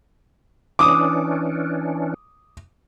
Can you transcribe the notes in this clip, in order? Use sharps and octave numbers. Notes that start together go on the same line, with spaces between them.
E3 C#4 D4 D6 D#6